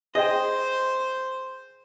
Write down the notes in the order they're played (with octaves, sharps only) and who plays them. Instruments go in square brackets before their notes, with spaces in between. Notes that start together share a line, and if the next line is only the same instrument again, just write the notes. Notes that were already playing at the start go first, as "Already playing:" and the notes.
[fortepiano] G#4 G5 [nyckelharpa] C5 [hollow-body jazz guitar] D#5